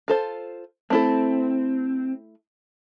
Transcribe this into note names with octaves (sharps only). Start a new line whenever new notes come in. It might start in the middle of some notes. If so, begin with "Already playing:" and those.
F4 A4 C5
A3 C4 E4 A4